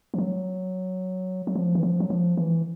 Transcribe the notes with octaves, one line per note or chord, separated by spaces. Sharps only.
F3
F#3
F#3
F3
E3
F3
F#3
F3
E3